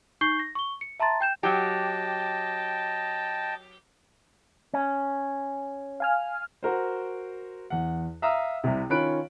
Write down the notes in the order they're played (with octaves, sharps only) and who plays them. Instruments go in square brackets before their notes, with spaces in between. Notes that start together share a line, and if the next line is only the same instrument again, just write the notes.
[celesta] D#4 C#6 G6 C7 G7
A#6
C#6 G7
C#7
E5 A5 A#5 C6 A6
G5 G6 E7
[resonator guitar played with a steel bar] F#3 G4 [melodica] D#5 G5 A5
[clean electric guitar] C#4
[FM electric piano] F5 G#5 F6
[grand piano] F#4 A#4 C5
E2 F#5
E5 F5 A#5 D#6 E6
C2 C3
D#3 C#4 F4 B5 F#6 D7